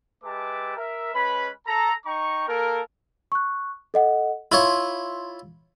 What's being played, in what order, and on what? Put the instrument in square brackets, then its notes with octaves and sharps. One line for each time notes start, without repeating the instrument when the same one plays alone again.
[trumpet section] G#3 G4 B4 E5 A5 D6
A#4 E5
G#3 C#4 B4 B5
A4 A#5
D#4 G5 A#5 C#6
A#3 A4 A#4
[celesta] C#6 F#6
A4 D#5 F#5
[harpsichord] E4 F4 C#5 [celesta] C6